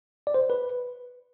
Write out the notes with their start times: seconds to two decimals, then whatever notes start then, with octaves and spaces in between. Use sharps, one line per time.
0.27 D5
0.34 C5
0.50 B4